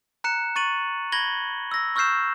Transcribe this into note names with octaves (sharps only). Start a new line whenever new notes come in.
A#5 F#6 C#7 E7
C#6 A6 D#7 F#7
B5 G#6 A#6 F#7 G7
E6 A#6
C#6 E6 F6 G6 C7 E7